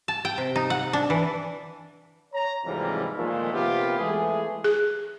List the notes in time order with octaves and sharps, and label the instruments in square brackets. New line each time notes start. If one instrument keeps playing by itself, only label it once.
[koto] A5
G5
C3
D#4
F#5
D4
E3
[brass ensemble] C#5 A#5
F2 G#2 C3 E3 G3 A#3
A#2 D#3 F3 G#3 A3
C3 A#3 B3 F4 G4
E3 G#3 A3 G#4
[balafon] G#4